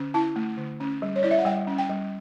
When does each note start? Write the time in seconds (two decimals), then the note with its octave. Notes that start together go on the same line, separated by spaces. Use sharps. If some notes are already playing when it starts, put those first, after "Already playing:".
Already playing: D3 C#4
0.14 E4 A5
0.36 A3
0.57 D3
0.80 C#4
1.02 G3
1.16 C#5
1.23 E4 D5
1.31 E5
1.39 F#5
1.45 G3 G5
1.67 C#4
1.78 G5
1.90 G3